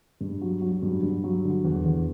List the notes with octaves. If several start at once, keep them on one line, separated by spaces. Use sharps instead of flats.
G2
F#3
F#3
G2
G2
F#3
D3
E2
E2